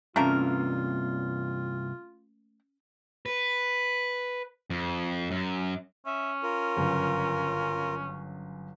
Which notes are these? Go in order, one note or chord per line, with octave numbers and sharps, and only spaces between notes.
G2 C3 A3 A#3 C#4 F4 A#4
B4
F2
F#2
C#4 E5
F4 A#4
G1 F#2 C#3